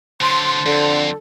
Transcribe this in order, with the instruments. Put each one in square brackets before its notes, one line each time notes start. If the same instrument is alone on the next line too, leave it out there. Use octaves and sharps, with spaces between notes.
[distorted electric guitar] D3 F#3 [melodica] C5 A5 [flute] C6
[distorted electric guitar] F2 [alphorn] D3 [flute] A4